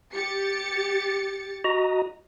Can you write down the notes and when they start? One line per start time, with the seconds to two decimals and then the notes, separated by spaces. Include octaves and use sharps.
0.14 G4 A6 C#7
1.64 F#4 D#5 A#5